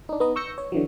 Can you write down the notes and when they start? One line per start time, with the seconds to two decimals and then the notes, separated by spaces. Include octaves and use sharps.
0.09 D4 D#4
0.20 B3 D#4 D#5
0.36 C#6 E6 G6 A#6 C#7
0.58 C#5
0.72 D3 E3 F#3